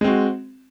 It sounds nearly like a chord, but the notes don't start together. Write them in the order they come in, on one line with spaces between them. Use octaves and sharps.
G#3 C4 F#4